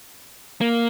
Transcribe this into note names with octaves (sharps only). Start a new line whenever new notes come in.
A#3